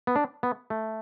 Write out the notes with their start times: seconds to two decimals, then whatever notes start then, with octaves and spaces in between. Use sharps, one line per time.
0.07 B3
0.16 D4
0.43 B3
0.70 A3